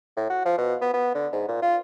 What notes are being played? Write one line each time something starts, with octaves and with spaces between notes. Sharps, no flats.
A2
F#4
F3
B2
B3
B3
D3
G#2
A#2
F4